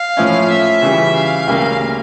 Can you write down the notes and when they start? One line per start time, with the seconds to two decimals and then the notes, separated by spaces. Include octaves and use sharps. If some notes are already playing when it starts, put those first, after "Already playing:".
Already playing: F5
0.17 A2 F3 C#4 E4
0.50 E5
0.82 C#3 E3 G3
1.15 F5
1.47 D2 C#3 G3 A#3